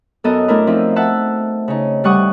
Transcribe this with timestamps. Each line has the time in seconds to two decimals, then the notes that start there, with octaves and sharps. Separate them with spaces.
0.24 F#2 B3 A4 A#4 D#5 D#6
0.48 A3 D4 E4 A#4
0.67 F3 C4 D#4 D#5 E5
0.96 E5 F#5 A5 E6
1.68 C#3 D#4
2.04 D2 G3 F#5 C#6 D#6